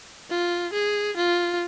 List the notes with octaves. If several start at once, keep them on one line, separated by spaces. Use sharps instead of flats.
F4
G#4
F4